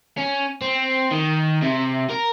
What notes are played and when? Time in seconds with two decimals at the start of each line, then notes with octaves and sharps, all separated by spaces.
0.17 C#4
0.62 C4
1.12 D#3
1.63 C3
2.10 A#4